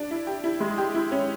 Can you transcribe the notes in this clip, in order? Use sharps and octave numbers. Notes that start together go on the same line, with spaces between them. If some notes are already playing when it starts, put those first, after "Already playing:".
Already playing: D4
E4
G4
E4
G#3
G4
E4
C#4